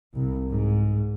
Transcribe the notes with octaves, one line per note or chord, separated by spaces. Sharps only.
C2
G#2